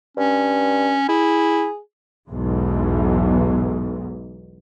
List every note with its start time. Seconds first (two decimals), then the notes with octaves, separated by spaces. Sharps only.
0.17 G2 C#4
1.09 E4 G#4
2.29 B1 E2 G#2